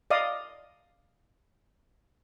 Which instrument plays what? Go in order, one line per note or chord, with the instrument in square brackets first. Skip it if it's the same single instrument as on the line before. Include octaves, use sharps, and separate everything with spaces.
[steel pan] D5 D#5 F5 D#6